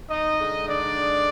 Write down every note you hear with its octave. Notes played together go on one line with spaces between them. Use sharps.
D#4 D#5
D3 G#3 D#4
D4 D5